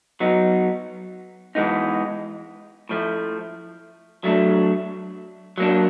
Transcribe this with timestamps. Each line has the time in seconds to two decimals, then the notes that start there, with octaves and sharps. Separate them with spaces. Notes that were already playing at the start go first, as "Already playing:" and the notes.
0.20 F#3 B3 D#4
1.55 E3 G#3 B3 D#4
2.89 A2 F3 A3
4.24 F#3 A3 D4
5.58 F#3 A#3 D4